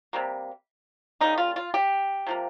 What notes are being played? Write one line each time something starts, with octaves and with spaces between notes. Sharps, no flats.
C3 G3 A#3
C#3 G3 A#3 D#4
F4
F4
G4
C3 F3 A#3